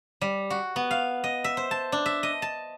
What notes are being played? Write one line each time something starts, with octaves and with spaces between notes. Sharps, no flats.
G3
F#4
B3
F5
D#5
E5
C5
A5
D4
E5
D#5
A5